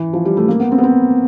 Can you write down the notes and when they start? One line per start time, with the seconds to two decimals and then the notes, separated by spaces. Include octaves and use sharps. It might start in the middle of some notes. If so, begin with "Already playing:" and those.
Already playing: E3
0.13 F3
0.25 G3
0.37 A3
0.48 A#3
0.60 B3
0.72 C4
0.78 B3
0.83 C4